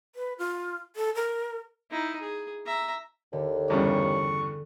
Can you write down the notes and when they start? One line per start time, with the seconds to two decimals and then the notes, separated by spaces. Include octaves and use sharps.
0.15 B4
0.38 F4
0.96 A4
1.15 A#4
1.91 D#4 E4
2.21 G#4
2.66 E5 A#5
3.33 D#2 D3
3.70 E2 G2 C#3 C#6